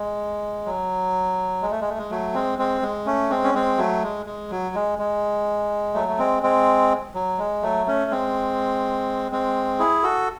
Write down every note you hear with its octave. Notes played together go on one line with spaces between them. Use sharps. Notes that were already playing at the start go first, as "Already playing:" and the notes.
Already playing: G#3
F#3
G#3
A3
G#3
A3
G#3
F#3 A3
G#3 C4
G#3 C4
G#3
A3 C#4
G#3 C4
C#4
G#3 C4
F#3 A3
G#3
G#3
F#3
G#3
G#3
F#3 A3
A3
G#3 C4
G#3 C4
F#3
G#3
F#3 A3
A3 C#4
G#3 C4
G#3 C4
E4 G#4
F#4 A4